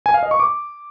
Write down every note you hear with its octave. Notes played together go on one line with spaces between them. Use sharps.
G#5
F5
D#5
C#6
D6